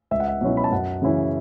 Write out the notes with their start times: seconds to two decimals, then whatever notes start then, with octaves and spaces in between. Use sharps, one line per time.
0.11 C#2 E5
0.20 F#5
0.28 E5
0.41 B2 F#3 C#4 E4
0.57 B5
0.64 A5
0.71 F#2 F#5
1.02 C#3 E3 C#4 E4